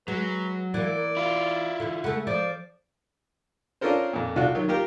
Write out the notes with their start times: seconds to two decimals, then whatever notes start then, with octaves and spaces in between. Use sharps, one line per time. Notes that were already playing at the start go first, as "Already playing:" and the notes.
0.08 F#3 G#3 B4
0.74 E3 A#3 D5
1.17 E4 F4
1.80 D3 E3
2.04 C#3 A3 F#5
2.27 F3 D5
3.81 C#4 D4 F4 A4 A#4 C5
4.13 F2 A#2
4.36 C2 F4 F#4 A4 D5 F#5
4.55 D#3 F#3
4.68 A#3 F4 G4 A#4